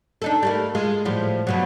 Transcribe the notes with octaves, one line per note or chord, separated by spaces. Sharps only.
D4 D#4 A4
G3 A3 A#3
G#3 F4 G#4
A2 F3 G3
G2 B2 F#3